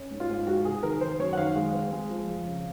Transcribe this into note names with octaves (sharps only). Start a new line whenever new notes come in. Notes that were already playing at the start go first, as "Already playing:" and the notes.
Already playing: C#4
G#2
F4
G#2
G#3 F#4
C3 G#4
D#3 A#4
D#3 C5
F#2 C#5
F#5
D#3 F5
G#3 F5
C4
G#3
F3
F2
C#3